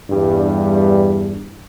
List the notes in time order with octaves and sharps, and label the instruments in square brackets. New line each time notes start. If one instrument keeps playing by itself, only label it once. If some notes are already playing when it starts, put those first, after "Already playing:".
[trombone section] E2 G2 G3 D4